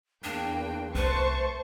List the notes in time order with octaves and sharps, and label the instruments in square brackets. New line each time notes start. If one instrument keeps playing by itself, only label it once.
[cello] E2 [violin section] A#3 G5 [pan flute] D4
[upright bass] C2 [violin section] A3 A5 C#6 [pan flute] B4 [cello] C5